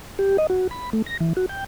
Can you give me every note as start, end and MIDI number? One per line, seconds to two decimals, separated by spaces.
0.19 0.37 67
0.38 0.47 75
0.50 0.68 66
0.71 0.90 83
0.93 1.02 57
1.06 1.17 94
1.20 1.33 52
1.37 1.46 66
1.49 1.64 79